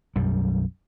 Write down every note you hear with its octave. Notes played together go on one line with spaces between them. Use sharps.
B1 F#2 G3